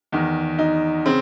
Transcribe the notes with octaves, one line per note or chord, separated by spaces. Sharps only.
E2 D#3
D#4
C#3 C4